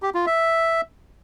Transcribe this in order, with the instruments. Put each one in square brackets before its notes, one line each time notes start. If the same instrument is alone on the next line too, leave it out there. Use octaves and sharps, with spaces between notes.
[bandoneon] G4
F4
E5